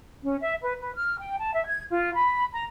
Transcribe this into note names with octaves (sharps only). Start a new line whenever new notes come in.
C#4
E5
B4
B4
F6
G5
A5
E5
G#6
F4
B5
A#5